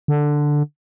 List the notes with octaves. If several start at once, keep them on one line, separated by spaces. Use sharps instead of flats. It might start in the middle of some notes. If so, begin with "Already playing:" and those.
D3